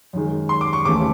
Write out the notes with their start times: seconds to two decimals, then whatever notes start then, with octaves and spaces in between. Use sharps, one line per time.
0.13 F#2 D#3 G#3
0.49 C6
0.61 D6
0.73 C#6
0.85 F1 D#2 C#3 E3 A3 D6